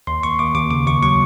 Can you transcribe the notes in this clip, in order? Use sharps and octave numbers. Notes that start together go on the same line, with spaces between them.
D#2 C6
D#2 C#6
D#2 D6
D#2 D6
C#3 D6
D#2 C#6
F#3 C#6